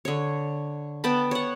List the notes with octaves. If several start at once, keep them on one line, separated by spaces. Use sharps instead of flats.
D3 C#5
B3 G5 A5 B5
C#5 F#5